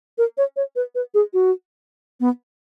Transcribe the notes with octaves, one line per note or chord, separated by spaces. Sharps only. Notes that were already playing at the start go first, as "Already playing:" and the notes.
A#4
C#5
C#5
B4
B4
G#4
F#4
B3